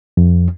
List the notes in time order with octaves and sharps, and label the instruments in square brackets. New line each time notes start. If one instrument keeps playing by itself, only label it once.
[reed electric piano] F2